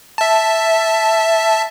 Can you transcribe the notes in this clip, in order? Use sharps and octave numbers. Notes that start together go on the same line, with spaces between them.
E5 A5